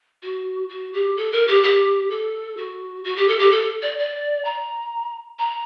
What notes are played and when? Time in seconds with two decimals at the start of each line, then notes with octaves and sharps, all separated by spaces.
0.23 F#4
0.69 F#4
0.93 G4
1.17 A4
1.32 A#4
1.47 G4
1.63 G4
2.10 A4
2.57 F#4
3.04 F#4
3.16 G4
3.28 A4
3.39 G4
3.51 A4
3.82 D5
3.98 D5
4.45 A#5
5.39 A#5